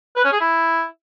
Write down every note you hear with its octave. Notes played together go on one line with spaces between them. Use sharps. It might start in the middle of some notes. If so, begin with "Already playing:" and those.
B4
C#4
G#4
E4